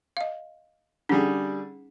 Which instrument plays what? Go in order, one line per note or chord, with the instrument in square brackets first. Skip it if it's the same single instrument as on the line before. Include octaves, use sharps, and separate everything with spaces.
[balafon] D#5 F5
[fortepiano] D3 G3 G#4 [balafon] C#4 D#4